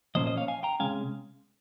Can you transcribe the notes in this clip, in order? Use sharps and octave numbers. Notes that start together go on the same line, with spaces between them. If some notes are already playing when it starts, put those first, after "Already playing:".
A#2 F3 A#3 C#4 C5 D#5
C5 D#5
C#5 F5
F5 G#5
G5 A#5
C3 D#3 G#3 C#4 F5 G#5